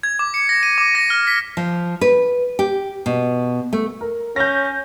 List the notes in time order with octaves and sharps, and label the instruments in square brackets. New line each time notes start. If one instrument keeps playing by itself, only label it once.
[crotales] G#6
D6
C#7
A#6
D#7
D6
A#6
F6
B6
[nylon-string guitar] F3
B4
G4
B2
A3
[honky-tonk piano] A#4
[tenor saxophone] C#4 [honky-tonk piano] G6 A#6